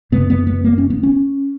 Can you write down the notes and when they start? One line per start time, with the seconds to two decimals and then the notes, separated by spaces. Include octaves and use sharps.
0.12 F#2 C#3 B3
0.30 B3
0.47 B3
0.64 A#3
0.78 C#4
0.90 B3
1.03 C#4